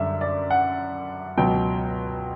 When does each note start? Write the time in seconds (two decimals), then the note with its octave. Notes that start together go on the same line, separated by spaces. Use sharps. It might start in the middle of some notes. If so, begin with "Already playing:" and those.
Already playing: F#2 D3 G3 E5
0.21 D5
0.51 F#5
1.37 C#2 B2 F#3 G5